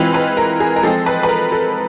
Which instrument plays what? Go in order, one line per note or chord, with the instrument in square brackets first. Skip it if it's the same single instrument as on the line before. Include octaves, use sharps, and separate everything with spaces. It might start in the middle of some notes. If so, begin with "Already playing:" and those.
Already playing: [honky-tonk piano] E3 G#3 C4 F4 B4
B4
A#4
G#4
A#4
F3 G#3 C4 A4
B4
B4
A#4
A4